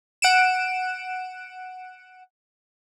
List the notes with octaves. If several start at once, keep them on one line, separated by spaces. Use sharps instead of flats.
F#5 D7 E7